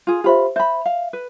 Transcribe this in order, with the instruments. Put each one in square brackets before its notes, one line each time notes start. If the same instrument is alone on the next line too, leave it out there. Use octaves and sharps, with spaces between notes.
[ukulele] F4 G#4
[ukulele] F4 B5 [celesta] G4 C5 E5
[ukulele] C5 B5 [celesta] E5
[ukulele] F5
B4